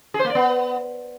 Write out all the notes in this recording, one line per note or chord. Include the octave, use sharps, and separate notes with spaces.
G#4
C5
A#3
D5
B3